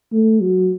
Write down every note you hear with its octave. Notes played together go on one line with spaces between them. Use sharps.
A3
F#3